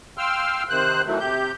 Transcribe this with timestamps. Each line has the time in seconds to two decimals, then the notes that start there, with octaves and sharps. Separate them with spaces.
0.18 F5 G5 C6 E6 F6
0.69 C3 D#3 C5 F#6
1.05 B2 D#3 E3 F#3 A3
1.20 C3 G4 G6